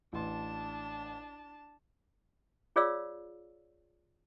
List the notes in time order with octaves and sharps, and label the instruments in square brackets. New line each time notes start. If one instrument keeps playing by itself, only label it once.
[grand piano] A1 C6 [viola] D4 A5
[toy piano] F4 G#4 C#5 D5 F5 E6